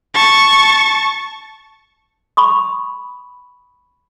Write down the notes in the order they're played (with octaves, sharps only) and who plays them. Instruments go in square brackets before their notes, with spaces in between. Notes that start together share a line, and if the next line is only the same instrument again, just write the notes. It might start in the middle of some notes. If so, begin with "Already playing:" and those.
[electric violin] A5 C#6
[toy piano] B5 C#6 D#6